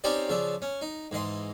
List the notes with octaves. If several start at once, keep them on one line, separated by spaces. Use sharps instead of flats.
C4 C#4 D#4 G4 C5 D5
C#3 F3 D4 E5
C#4
D#4
G#2 E3 D#5 C6